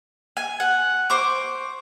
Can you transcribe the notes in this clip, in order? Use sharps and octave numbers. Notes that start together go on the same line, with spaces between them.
G#5
F#5
C5 C#6 D6